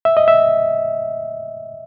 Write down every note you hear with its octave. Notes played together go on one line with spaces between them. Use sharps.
E5
D#5
E5